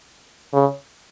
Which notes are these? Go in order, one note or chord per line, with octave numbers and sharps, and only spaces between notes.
C#3